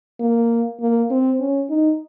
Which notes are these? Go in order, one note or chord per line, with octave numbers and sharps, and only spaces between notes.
A#3
A#3
C4
C#4
D#4